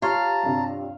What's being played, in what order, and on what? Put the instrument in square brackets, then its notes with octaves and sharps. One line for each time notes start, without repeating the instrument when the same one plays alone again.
[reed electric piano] F4 C#5 C6 [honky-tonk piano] G4 [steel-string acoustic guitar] F5 [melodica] A5 A#5
[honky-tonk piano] G2 C3